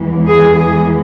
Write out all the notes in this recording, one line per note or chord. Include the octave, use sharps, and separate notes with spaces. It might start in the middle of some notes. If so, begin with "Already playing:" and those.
Already playing: E2 E3 G#3
G#4
G#4